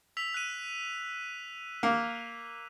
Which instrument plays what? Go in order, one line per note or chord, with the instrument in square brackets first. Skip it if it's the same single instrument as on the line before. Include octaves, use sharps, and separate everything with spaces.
[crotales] E6 B6 F7
F#6 D#7
[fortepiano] A#3